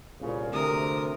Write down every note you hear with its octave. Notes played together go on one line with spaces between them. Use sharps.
C2 A#2 C#3
D2 C3 A#4 D#6